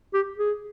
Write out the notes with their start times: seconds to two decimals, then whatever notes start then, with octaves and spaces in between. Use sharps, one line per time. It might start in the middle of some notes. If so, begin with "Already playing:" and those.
0.14 G4
0.38 G#4